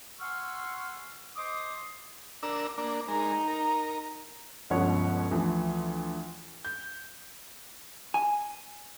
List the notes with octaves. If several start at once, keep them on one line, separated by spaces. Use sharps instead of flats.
F#5 G#5 C6 C#6 E6 F6
C5 D#5 C6 D6 D#6
D4 A#4 E6
A#3 D4
G#3 D#4 A#4
A#4
G1 C#2 B2 F3 C#5 F#5
D2 E3 F3
G6
G#5